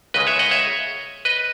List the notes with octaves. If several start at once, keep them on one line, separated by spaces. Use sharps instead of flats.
C#2 C#3 G#3 B4 D#5
C#5 E5
D#5 F#5
C#5 E5
B4 D#5